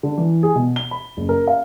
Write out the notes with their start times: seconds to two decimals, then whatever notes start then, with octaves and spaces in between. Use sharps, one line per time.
0.03 D3
0.18 E3
0.43 G#4
0.55 B2
0.76 G7
0.91 B5
1.17 F#1
1.29 A#4
1.48 F5